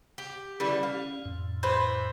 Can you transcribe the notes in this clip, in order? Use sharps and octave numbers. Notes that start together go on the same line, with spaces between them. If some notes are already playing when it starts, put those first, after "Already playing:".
G4
D3 E3 G3 C#4
F5
F2 A2
E3 B4 C5